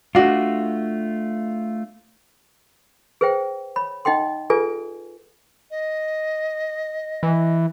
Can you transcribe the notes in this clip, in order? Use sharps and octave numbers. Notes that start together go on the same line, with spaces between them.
A3 D4 F4 F#4
G#4 B4 C5 E5 G5
C#5 B5
D#4 D#5 F#5 G5 C6
F4 G#4 A4 B4 D5 G#5
D#5
E3